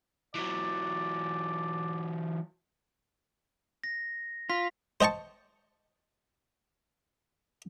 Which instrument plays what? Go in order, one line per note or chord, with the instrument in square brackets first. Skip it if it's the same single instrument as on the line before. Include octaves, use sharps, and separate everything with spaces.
[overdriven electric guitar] E3 F#3 [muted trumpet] D5
[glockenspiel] A#6
[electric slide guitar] F4 [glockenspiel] B6
[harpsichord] C5 D#5 G5 A5 C#6